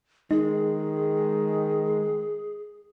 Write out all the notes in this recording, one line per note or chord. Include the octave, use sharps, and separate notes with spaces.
D#3 G#3 D#4 G#4